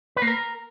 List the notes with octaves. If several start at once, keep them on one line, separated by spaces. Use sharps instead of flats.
B4
A#3
A#4